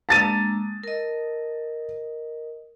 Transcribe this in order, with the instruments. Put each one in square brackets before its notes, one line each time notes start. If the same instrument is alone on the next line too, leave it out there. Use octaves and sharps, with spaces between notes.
[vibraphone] G#3 A#3 D4 [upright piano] A5 A6 D#7
[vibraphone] A#4 D#5